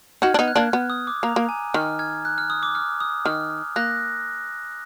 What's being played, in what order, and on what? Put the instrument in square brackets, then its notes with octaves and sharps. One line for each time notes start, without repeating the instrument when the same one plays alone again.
[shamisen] D#4 F#4 [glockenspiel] F6 G#6
[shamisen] D4
B3 D#4
[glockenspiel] F#6
[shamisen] A#3 D4
[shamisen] B3 [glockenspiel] F6
[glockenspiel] D#6
D6
[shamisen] A#3 [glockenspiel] A#5
[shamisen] A#3
[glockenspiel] G#5
[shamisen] D#3 [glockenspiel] F6
[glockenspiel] F6 G#6
F#6
F6
D#6
D6
F6
D#6
[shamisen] D#3 [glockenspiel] F6
[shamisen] A#3 [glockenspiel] F#6 A#6